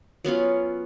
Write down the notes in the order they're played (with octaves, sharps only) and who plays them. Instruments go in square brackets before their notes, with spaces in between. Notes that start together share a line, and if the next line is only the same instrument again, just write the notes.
[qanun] F#3 B3 C#4 F4